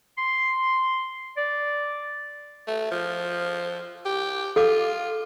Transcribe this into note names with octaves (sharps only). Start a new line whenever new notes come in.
C6
D5
A3
F3
G4
F4 A4 F5 D6